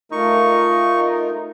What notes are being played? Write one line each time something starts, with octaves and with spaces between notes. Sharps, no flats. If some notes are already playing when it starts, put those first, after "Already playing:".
A3 D#4 F4 A#4 C#6